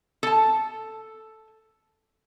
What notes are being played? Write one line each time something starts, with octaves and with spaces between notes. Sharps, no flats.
A4 A5